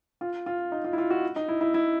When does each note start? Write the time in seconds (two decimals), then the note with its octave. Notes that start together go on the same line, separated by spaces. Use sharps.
0.21 F4
0.46 F4
0.72 D#4
0.84 F4
0.93 E4
0.98 F4
1.10 F#4
1.36 D#4
1.48 E4
1.61 E4
1.74 E4